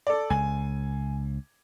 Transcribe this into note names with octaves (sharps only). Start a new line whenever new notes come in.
A4 D5
C#2 G#5